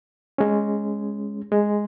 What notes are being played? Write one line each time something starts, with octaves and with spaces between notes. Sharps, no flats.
G#3 C#4
G#3